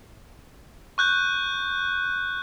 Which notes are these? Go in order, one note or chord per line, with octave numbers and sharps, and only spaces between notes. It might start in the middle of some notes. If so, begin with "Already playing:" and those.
C#6 F#6 G6